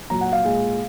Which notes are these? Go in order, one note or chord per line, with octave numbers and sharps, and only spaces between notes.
A#2 F#3 A#5
F#5
F5
A#2 G#3